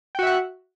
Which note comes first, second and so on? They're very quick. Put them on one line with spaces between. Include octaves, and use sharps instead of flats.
G5 F#4 E5 F#5